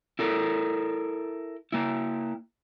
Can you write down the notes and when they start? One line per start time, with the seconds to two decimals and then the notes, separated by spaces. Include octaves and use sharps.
0.19 E4 A4 A#4
1.72 A#3 E4